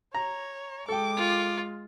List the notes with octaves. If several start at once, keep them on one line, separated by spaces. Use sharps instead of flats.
C#5 A#5
G#3 A4 G5 D6
F4